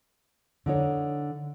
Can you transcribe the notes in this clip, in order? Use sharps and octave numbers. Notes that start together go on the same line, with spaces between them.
D3 D#4 C#5